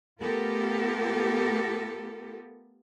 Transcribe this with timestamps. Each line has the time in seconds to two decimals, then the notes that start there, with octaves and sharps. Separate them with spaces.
0.21 A3 B3 F4 G4 A4 A#4